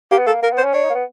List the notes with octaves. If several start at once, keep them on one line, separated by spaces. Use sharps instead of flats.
A#3 G4
B3
A#3 A4
A#3 A#4
B3
C5
C#4
D4 C#5
D#4
A#3
B3